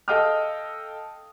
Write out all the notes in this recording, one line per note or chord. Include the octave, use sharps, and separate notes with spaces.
A4 D#5 F5 G5 D#6 F6